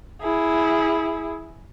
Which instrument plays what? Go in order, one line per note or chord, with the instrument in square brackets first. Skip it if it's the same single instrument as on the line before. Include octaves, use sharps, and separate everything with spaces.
[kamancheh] E4 G#4